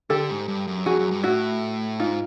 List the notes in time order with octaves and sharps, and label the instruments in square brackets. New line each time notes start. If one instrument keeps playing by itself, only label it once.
[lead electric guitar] D3 [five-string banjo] G4 A4
[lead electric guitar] G#2
G2
F#2
[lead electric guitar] F2 [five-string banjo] F#4 G#4
[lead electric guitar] F#2
G2
[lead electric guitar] A2 [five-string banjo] E4 F#4
[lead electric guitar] G#2 [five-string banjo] D#4 F4